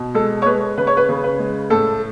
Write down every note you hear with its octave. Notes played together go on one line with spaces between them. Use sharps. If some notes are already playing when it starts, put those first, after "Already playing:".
Already playing: B2
G#3 A4
C#5
G#3 B4
C#3 B4
C#5
B4
C#3
B4
G#3
A2 A4